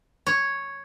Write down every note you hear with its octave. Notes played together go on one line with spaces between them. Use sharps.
C#5